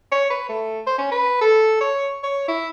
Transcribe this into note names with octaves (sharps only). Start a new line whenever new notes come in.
C#5
B4
A3
C5
C#4
B4
A4
C#5
C#5
E4